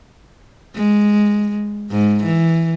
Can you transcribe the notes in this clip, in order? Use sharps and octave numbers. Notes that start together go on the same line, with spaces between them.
G#3
G#2
E3